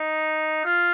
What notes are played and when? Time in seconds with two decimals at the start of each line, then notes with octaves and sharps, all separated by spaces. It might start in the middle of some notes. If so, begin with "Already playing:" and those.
Already playing: D#4
0.65 F4